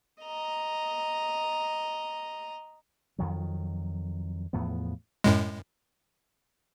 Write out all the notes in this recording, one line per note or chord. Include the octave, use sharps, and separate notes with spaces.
D#5 A#5
F2 D#3 F#3
E2 A2 F3 B3
F#2 A2 G#3